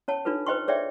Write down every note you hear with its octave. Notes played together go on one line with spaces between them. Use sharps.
C#4 C#5 A5
D4 D#4 F4 A4 B4
B4 C5 D#5 G5 C6 C#6
G#4 C#5 D5 E5 G5